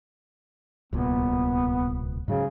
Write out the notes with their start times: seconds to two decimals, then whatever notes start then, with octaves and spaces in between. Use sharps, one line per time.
0.93 D1 C2 A#2 B3
2.28 G#2 C#3 F#3